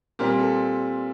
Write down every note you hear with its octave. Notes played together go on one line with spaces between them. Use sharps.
A#2 G3 C4 G4 A#4
A4